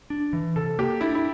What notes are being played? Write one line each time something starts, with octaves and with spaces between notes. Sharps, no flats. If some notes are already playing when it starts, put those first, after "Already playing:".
D4
E3
C3 A4
A#3 G4
D4 E4
E4